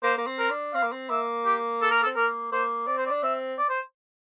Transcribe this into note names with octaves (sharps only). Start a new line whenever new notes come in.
A#3 C5
A#3
C4
A#4
D4
C4 F5
A#3
C4
A#3 E5
G4
A4
A#4
A4
C4
A#3 A#4
A#3 C5
C4 D5
C5
D5
D4
C4 E5
D5
C5